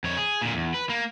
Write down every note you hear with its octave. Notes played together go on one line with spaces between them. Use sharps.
F2 C#5
G#4
A#2 D3
E2
B4
A#3